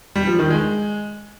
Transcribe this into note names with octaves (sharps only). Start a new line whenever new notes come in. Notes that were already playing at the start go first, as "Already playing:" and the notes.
G3
F3
D#3
G#3